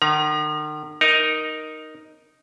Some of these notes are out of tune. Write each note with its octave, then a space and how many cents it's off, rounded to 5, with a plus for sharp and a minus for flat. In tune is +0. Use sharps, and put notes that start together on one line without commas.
D#3 -40 A#5 +35
D#4 +0 A#4 +5